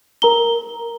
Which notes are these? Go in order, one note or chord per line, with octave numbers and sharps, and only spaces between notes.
A#4 A#5 G7